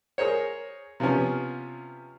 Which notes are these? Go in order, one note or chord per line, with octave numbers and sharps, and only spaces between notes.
G#4 A#4 C5 C#5
C3 F3 B3 C#4